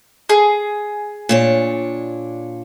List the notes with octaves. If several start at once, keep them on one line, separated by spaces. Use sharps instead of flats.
G#4
A#2 D4 C#5